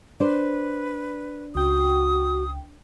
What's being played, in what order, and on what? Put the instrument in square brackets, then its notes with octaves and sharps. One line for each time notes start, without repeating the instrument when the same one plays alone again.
[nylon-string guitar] D4 C5 [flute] B4
[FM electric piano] C#2 G5 [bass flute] F#4 [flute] D#6